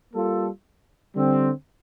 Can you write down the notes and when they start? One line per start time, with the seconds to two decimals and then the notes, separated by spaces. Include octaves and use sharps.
0.13 G3 A#3 F4 A4
1.15 D3 G3 C4